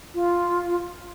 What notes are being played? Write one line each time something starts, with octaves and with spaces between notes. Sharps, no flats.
F4